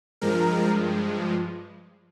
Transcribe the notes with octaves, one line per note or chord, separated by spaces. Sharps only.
G2 F3 G#3 A#4